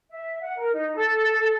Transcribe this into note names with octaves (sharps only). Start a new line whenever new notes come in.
E5
F#5
A#4
D#4
A4